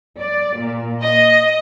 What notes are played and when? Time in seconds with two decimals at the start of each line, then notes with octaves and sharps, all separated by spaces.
0.20 D5
0.58 A#2
1.02 D#5